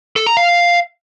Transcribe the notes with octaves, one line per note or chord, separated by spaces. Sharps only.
A4
A#5
F5